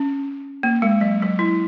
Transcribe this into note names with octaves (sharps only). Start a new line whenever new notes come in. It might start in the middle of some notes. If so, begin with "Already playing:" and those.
Already playing: C#4
A#3
G#3
F#3
F#3
E4